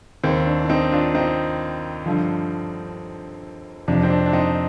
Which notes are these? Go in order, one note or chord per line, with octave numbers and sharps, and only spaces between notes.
D#2 D#3 C4
D4
D4
C4 D#4
D4 F4
C4 D#4
G2 D3 F3
F2 C3 F3 D4
C4
D4
D4
C4 D#4